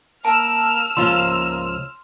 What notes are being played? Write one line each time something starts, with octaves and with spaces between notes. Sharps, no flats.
A#3 A5 E6 F6
C#2 F3 A#3 F4 C6